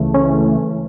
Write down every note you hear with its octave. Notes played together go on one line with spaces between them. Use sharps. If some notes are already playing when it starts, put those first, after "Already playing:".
Already playing: C#2 C#3 E3 A3
C#4